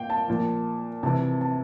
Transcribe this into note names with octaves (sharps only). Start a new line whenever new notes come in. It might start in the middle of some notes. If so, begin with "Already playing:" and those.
Already playing: A#2 F5 G5
A5
A#2 F3
C3 E3 A5
A5